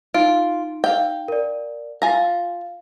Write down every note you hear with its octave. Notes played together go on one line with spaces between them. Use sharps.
D#4 F4 D7
F5 G5
A#4 D5
F4 F5 G#5 A#5